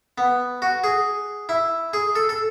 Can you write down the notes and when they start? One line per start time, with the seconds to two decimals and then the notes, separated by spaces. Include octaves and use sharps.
0.18 B3
0.62 F#4
0.84 G#4
1.49 E4
1.93 G#4
2.15 A4
2.29 A4